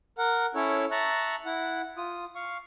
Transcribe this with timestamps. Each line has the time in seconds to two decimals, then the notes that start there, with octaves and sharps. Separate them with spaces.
0.18 A#4 F#5
0.55 C#4 E4 A4 C#5
0.91 E5 A5 A#5 C#6 F#6
1.46 E4 F#5
1.97 F4 D#6
2.35 F5 C#6